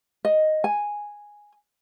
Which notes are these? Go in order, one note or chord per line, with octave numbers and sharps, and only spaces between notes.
D#5
G#5